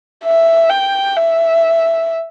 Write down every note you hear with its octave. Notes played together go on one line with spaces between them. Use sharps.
E5
G5
E5